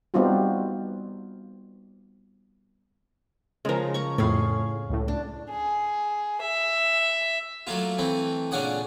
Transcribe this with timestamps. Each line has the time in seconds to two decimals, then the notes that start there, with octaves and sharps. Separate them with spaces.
0.14 G3 B3 C4 D#4 F4 F#4
3.65 C#3 F3 G#3 A#4
3.94 C#5 A#5 C#6
4.18 F2 A2 C#4 G#4 F5
4.89 C#2 A2
5.08 D4
5.50 G#4
6.41 E5
7.67 F#3 A3 A#3 F4
7.98 E3 A3 C4
8.51 A#2 C#3 C#4 D4 F#5 D#6